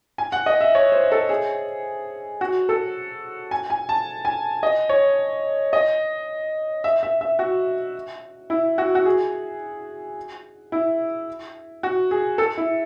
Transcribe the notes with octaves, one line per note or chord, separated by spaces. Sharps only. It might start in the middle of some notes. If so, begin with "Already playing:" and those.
G#5
F#5
D#5
E5
C#5
C5
A4
G#4
F#4
A4
G#5
G#5
A5
G#5
D#5
C#5
D#5
E5
E5
E5
F#4
E4
F#4
F#4
G#4
E4
F#4
G#4
A4
E4